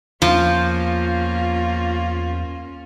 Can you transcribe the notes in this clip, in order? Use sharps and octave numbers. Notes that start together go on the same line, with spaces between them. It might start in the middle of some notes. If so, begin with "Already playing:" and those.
E2 F3 A#3 C#4 F4